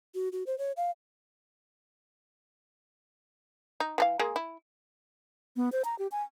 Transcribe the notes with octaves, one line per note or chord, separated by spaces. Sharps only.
F#4
F#4
C5
C#5
F5
D#4
E3 A4 F5
G#3 A#3 G#4
E4
B3
C5
A#5
G4
G#5